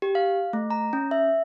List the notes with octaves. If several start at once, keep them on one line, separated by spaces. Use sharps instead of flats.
G4
F5
A3
A#5
C#4
E5